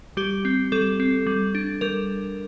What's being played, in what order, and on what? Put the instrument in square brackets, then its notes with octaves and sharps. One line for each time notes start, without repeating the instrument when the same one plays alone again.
[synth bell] G3 G4
C4
G3 A4
C4
G3
D4
G3 A#4